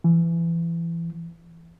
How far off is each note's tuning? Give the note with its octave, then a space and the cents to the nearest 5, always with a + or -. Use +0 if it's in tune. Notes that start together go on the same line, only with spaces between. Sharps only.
E3 +25